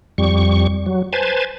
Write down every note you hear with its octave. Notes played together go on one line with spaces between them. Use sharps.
F2 G3 C#6
F#3
B4 C5 G#5 A5